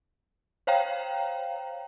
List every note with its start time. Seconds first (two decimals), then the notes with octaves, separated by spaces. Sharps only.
0.67 C5 C#5 F5 G5 A#5